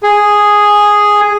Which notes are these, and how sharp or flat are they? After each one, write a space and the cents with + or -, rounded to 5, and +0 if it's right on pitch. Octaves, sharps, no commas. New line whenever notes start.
G#4 -5